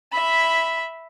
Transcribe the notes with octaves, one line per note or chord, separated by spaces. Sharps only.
E5 B5